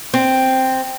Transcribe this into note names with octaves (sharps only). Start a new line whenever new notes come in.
C4